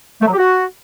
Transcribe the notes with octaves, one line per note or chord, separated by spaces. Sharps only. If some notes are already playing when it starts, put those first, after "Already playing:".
A3
F#3
G4
F#4